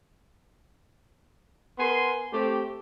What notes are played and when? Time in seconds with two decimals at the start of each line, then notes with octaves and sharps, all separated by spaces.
1.78 B3 A#4 G#5 C6
2.32 A3 C4 G4